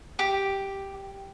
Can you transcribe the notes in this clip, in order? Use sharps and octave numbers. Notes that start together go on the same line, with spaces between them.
G4